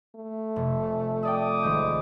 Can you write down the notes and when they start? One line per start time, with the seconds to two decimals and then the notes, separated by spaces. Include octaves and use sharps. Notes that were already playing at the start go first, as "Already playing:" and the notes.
0.15 A3
0.56 F1
1.25 D5 G5 D6 D#6
1.63 G#1 G#3 G6